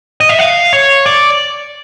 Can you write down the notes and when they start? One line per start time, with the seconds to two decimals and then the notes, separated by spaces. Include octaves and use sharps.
0.20 D#5
0.29 E5
0.39 F5
0.73 C#5
1.06 D5